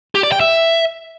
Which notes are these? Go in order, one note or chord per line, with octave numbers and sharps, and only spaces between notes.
G4
D5
G5
E5